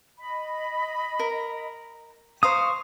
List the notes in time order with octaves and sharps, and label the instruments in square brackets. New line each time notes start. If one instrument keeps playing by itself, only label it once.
[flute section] D#5 B5
[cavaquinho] A#4
[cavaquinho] C5 F5 A#5 [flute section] C#6 [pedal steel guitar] D#6